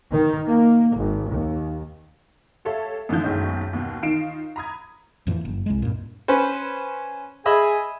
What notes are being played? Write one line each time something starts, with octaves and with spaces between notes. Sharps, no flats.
D#3
A#3
G#1
D#2
G4 A4 C#5 E5 F5
F#2 D3 D#3 F3 G6
F#1 B1 D#3 G#3 C#4 D#5
D#2 B2
D#3 D#4 F4 C7 D7 E7
A#5 B5 D#6 G#6
F2 A2 E3 F3
F#1
C2 G#3
G2 A#2
C#4 B4 C5
G#4 D#5 E5 G#5 B5